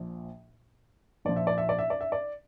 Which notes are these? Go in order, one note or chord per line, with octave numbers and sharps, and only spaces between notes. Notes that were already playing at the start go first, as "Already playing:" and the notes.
Already playing: A#1 A#2 F3
A#1 A#2 F3 D5
E5
D5
E5
D5
E5
D5
E5
D5